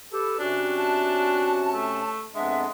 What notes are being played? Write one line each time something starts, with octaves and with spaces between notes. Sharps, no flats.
G4 A4 B4
C3 C#4 D4 F#4
A5
A3
F2 G#3 B3 D4 E5